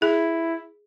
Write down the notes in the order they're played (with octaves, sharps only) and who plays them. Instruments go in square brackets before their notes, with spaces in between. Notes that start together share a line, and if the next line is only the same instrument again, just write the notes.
[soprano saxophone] E4 [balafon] G#4